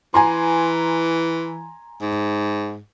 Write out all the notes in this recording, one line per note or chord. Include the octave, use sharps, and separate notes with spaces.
E3 G#5 A#5 C6
G#2